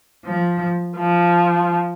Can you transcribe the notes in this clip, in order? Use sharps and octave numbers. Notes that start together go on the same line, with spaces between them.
F3
F3